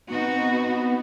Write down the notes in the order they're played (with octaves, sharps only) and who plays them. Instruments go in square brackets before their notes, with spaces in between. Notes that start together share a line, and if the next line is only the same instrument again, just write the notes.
[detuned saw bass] B3 [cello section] C4 D#4 F#4